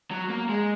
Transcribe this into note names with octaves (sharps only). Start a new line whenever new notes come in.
F#3
A#3
G#3